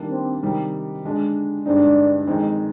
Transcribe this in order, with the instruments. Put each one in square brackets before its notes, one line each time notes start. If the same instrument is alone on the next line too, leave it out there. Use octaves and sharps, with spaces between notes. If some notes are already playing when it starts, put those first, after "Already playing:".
Already playing: [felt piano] D#3 G3 A#3 D4
[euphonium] C4
[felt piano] C3 D#3 G3 C4 D#4
D3 G#3 D4
[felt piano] G2 D3 G#3 C4 D#4 [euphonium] D4
[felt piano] F2 D#3 G#3 C4 D#4